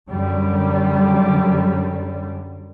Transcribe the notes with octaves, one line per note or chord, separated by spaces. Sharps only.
F#2 D3 G3